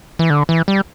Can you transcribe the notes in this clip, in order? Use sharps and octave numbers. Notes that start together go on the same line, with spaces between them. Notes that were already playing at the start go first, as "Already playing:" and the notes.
E3
D3
E3
G3